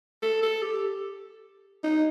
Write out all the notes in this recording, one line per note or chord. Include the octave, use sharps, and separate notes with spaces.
A4
A4
G4
D#4